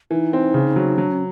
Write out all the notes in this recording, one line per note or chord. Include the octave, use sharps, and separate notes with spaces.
E3 D#4
C4
C#3
F#3
F#3 D4
C#4